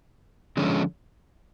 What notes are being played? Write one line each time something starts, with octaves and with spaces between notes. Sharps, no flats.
D3 F3 G#3 C#4 F4